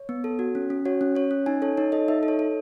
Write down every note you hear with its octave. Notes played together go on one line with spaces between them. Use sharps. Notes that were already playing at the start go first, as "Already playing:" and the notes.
Already playing: C#5
B3
A4
F#4
C#4
C#4
F#4 C#5
C#4
C#4 C#5
C#4
D#4 G#5
A4 C#5
D#4 C#5
A4 D#5
D#4 E5
A4
C#5
A4